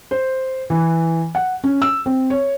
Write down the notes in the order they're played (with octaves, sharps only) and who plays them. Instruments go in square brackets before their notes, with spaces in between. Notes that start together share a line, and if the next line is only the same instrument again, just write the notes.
[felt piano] C5
E3
F#5
C#4
E6
C4
C#5